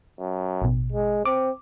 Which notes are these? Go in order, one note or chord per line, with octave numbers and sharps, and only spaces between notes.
F#2
A1 B2
G#3
C4 D6